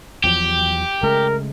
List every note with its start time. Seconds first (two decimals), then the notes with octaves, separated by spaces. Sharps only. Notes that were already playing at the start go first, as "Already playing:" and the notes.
0.24 E2 F3 F#3 G4
1.03 C#3 G#3 A3 A#4